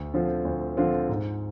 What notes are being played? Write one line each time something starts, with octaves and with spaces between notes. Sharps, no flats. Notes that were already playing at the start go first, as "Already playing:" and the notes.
Already playing: D2
D3 F3 C4 F4
D2
D3 F3 C4 F4
G#2